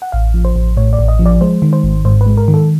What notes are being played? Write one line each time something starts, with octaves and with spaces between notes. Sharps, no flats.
F#5
A1 F5
F3
C5
A1
A2 C#5
D5
A1
D#5
F3
D5
G#3 C5
D#3
C5
G#1
G#2 C5
B4
G#3
A#4
D#3
A4